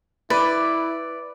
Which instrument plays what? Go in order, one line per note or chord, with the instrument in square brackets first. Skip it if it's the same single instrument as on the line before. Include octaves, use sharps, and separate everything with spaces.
[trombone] E4 [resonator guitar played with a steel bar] B4 [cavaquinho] D5